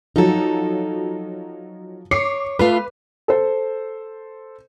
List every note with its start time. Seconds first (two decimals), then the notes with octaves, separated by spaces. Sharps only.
0.16 F3 F#3 D#4 A4
2.11 C#5 D6 C7 C#7
2.59 A3 F4 B4 F5
3.28 A4 C5